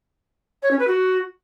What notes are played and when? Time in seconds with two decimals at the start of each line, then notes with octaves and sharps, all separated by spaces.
0.62 C#5
0.70 C#4
0.79 B4
0.87 F#4